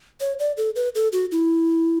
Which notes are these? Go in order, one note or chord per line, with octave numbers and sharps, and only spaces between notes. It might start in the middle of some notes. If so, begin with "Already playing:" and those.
C#5
D5
A4
B4
A4
F#4
E4